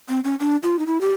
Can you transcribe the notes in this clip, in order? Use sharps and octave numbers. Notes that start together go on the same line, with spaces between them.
C4
C#4
D4
F4
D#4
E4
G4